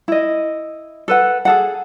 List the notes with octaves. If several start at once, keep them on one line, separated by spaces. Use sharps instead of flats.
E4 D#5
A4 B4 F#5
G#4 A4 F#5